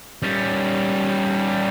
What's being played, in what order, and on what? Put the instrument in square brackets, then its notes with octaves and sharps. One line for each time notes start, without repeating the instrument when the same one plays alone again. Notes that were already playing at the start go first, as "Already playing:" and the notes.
[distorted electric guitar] G3 C#4